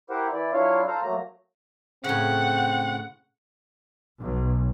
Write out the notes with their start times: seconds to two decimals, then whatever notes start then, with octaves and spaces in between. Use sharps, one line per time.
0.10 E4 G4 A#4 C5 F#5
0.32 E3 E4 D5
0.53 F#3 D4 E4 F4 C#5 F5
0.88 A4 C5 F5 A#5
1.03 F#3 A3 A#3 A#5
2.04 A2 C#3 C4 F#5
4.20 B1